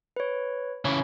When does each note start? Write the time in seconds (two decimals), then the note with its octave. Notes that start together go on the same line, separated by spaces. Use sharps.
0.16 B4 C#5
0.85 C#3 E3 C#5